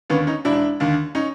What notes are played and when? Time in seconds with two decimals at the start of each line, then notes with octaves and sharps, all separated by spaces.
0.10 D#2 D3 B3 C#4
0.27 C#4 D#4
0.45 E1 D4 E4
0.80 D#2 D3
1.15 C#4 D#4